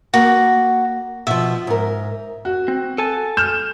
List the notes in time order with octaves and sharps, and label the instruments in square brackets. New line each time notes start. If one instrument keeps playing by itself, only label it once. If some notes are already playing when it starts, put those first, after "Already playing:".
[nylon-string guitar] A#3 [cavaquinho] F#4
[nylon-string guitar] B2 F3 [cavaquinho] E5
[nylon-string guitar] G#2 A#4
[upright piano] F#4
[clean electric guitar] C4
A4 G#5 A5
[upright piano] F6 G6 E7